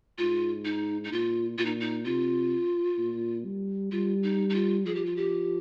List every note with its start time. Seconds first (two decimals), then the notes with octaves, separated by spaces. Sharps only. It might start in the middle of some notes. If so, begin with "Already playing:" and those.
0.18 G#2 F4
0.65 D#4
1.04 D#4
1.12 A#2 F4
1.58 A#2 F4
1.65 D#4
1.80 D#4
2.05 C3 F4
2.98 A#2
3.45 G3
3.92 G3 F4
4.23 D#4
4.50 D#4
4.55 F4
4.85 F3 G#4
4.95 G4
5.05 F4
5.16 G4